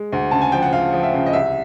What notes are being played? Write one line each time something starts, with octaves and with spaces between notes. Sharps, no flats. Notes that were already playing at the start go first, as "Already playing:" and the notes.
Already playing: G#3
D2
C#3 A5
G#5
F3 G5
F#5
D2 F5
F3
E5
C#3
D#5
C2 E5